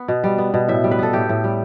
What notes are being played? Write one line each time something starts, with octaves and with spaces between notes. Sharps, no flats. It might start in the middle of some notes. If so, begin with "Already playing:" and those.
Already playing: B3
B2
G3
B3
B2
A2 E5
G3
B4
B3 A4
A2 G4
A2
G3